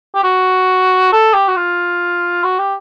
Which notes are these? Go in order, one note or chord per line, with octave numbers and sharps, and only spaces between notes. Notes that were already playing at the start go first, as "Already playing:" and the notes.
G4
F#4
A4
G4
F#4
F4
F#4
G4